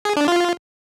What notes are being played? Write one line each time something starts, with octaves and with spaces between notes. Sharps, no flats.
G#4
D4
F4